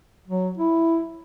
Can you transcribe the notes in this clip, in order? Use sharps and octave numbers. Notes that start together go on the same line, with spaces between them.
F#3
E4